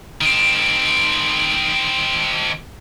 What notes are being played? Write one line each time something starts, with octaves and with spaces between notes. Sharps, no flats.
D#3 C4